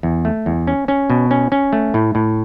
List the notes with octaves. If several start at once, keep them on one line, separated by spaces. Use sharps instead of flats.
E2
A3
E2
C#4
C#4
B2
C#4
C#4
A3
A2
A2